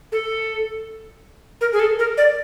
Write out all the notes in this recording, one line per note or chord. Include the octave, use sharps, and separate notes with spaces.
A4
A#4
G#4
A4
A#4
D5